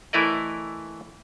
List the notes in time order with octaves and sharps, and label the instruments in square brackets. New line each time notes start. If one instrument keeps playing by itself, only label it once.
[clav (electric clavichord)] E3 A3 E4 A#4 D5 D#5